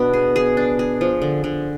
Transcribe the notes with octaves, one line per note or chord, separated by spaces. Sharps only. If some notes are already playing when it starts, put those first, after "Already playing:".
Already playing: B2 B3 D4
G#4
G#4
D4
G#4
F3
D3
D3